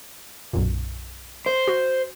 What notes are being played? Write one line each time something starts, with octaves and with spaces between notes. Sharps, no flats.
B1 F#2 A#2
C5
F#4